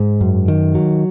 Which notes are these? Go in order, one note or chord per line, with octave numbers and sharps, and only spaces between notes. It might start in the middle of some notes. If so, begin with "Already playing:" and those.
Already playing: G#2
F#2
D#3
F#3